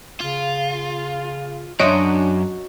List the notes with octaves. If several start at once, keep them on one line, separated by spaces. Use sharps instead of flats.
C#3 F4
F#2 D4 F#4 C#5 D#5 E5 C6 D7